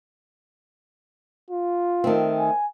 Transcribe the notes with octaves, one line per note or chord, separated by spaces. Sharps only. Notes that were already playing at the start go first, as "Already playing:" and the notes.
F4
D#3 A3 C4
G#5